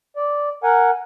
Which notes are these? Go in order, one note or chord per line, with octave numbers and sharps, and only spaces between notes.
D5
A#4 F#5 G#5